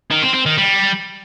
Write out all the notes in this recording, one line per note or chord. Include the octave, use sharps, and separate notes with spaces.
D#3
C4
C4
D#3
G3